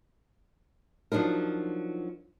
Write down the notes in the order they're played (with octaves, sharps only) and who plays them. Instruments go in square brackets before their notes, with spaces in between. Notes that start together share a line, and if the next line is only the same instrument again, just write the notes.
[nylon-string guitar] F3 F#3 D4 D#4 A#4